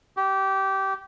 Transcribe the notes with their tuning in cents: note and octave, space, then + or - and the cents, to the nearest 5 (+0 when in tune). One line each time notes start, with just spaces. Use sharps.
G4 -20